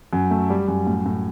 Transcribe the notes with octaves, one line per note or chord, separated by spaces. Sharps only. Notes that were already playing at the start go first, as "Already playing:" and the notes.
F#2
A3
G3
F#2
A2
A2